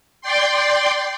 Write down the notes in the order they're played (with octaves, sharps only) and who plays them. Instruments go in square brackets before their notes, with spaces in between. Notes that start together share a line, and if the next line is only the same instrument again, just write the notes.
[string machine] D5 G5 C6